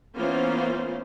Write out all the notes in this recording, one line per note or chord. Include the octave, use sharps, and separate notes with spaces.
E3 A#3 B3 C#4 F4 C5